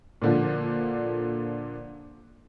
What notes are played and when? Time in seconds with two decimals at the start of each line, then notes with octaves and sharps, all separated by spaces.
0.22 A#2 D3 F3